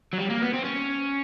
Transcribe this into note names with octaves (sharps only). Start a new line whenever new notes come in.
F#3
G3
A#3
B3
C4
C#4